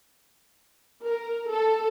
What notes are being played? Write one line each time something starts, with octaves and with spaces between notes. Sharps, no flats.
A#4
A4